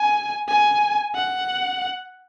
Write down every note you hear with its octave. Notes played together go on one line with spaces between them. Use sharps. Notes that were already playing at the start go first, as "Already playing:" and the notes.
Already playing: G#5
G#5
F#5